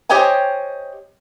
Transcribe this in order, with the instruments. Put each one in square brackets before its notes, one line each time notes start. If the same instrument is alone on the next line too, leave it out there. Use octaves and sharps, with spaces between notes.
[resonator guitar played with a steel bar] G4 C5 C#5 D#5 G5 G#5